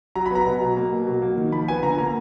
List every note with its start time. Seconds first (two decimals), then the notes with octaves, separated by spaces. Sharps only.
0.15 F#3 A#5
0.26 B5
0.31 B3 A#5
0.46 B2
0.61 F#3
0.77 A#3
0.92 B2
1.07 F#3
1.22 A#3
1.37 D#3
1.52 F3 B5
1.68 B3 G#5
1.83 D3 A#5
1.98 A#3 A#5